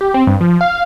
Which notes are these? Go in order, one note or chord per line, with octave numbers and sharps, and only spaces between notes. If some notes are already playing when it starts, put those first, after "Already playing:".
G4
C4
G2
F3
F5